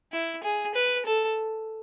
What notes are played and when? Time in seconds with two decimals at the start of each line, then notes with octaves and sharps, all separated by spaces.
0.13 E4
0.43 G#4
0.75 B4
1.06 A4